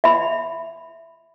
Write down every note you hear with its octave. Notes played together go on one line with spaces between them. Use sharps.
E5 B5